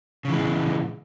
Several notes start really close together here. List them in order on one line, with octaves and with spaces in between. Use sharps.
C#3 E3 G#3 A#2